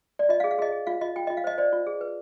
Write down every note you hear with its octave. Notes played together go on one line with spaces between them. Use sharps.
D5
F4 D#5
F5
G#4
F5
G#4 D#5
G#4
F4 F5
F4 D#5
F4 G5
F4 D#5
F5
C5 D#5
C5 D5
F4
G#4
B4